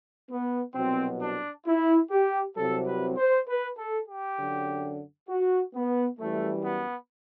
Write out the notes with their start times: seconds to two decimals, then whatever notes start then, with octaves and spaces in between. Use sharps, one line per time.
0.30 B3
0.75 C2 B2 F#3 C4
1.21 D4
1.66 E4
2.11 G4
2.57 C2 C3 F#3 A4
2.87 B4
3.17 C5
3.48 B4
3.78 A4
4.08 G4
4.38 F#2 D3 F#3
5.29 F#4
5.74 B3
6.19 F#2 E3 G3 A3
6.64 B3